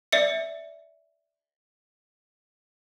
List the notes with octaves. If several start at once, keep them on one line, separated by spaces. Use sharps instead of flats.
D5 E5 C#7